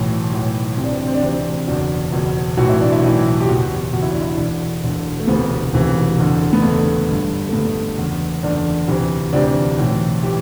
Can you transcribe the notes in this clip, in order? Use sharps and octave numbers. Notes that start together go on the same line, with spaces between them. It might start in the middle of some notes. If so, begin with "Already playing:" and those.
Already playing: B1 A2 E3
B1 A2 E3
D2 C3 E3 C4
D4
C4
D4
C4
D4
D2 C3 E3 C4
F#1 E2 B2 D4
F#1 E2 B2
B1 A2 E3 F#4
E4
D4
E4
B1 A2 E3
G4
F#1 E2 B2 F#4
F#1 E2 B2 F#4
E4
D4
E4
E1 E2 D3 D4
E1 E2 D3
A3
E1 D2 C3 E3 B3
E1 D2 C3 E3
F#1 E2 D3
B3
F#1 E2 D3 A3
G1 G2 D3
A3
G1 G2 D3 B3
F#1 E2 D3
F#1 E2 D3 D4
D2 C3 E3
D2 C3 E3 D4
B1 A2 E3
A2 E3 G4